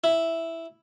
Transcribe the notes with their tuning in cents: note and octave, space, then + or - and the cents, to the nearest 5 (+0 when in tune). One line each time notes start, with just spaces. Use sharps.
E4 +0